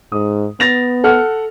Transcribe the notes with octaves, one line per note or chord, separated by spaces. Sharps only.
G#2 D#6
B3 A6 A#6 F7
A4 F#5 F6